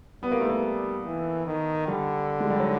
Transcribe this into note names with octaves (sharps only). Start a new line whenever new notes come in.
G3 B3
A#3
A3
A#3
E3
D#3
D3 G3
G#3
G3
F#3